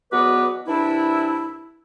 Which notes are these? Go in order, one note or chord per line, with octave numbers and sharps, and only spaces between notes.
E2 F#3 B3 B4 D#5 D6
C2 E3 D4 E4